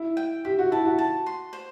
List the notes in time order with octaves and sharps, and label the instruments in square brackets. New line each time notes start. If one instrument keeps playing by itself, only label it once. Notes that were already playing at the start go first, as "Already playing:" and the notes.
Already playing: [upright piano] E4
[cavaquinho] G5
[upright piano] G4 [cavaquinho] E5
[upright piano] F#4
[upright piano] E4 [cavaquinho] A5
[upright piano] F#4
[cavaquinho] A5
C6
C5